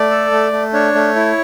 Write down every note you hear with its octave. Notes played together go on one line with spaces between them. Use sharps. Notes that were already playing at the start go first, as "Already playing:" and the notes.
Already playing: A3 D5
A4
A3
A3
D4 C#5
A3
E4